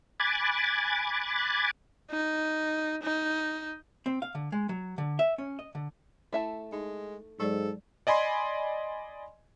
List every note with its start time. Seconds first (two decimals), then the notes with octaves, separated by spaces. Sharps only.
0.20 G#5 B5 D6 F#6 G#6 A6
2.11 D#4
3.03 D#4
4.06 C4
4.22 F5
4.35 D3
4.52 G#3
4.69 F#3
4.98 D3
5.19 E5
5.38 C#4
5.59 D#5
5.75 D3
6.33 A3 E4 E5 A5
6.72 G#3 D#4
7.40 G#2 F#3 G#3 A4 D5
8.07 D5 D#5 G#5 B5 C6